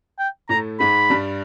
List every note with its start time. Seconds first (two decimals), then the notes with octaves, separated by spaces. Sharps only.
0.19 G5
0.49 A2 A3 A#5
0.80 G#2 G#3 B5
1.10 G2 G3